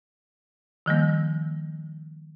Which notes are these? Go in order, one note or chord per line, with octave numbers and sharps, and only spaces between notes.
D#3 F3 G3 A#3